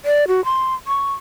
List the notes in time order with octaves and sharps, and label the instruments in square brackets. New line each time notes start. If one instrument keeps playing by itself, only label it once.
[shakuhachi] D5
F#4
C6
C#6